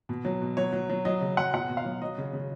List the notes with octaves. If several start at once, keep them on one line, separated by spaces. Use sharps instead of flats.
B2
F#3
B2
F#3 C#5
F#3
F#3
F#3 D#5
C#3
F#3 F#5
B2 F#5
B2
F5
F#3
F#3 D#5
C#3
C#3